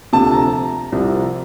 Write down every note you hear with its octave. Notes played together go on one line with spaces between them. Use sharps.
D2 C3 F3 A5
A#5
C2 C3 F3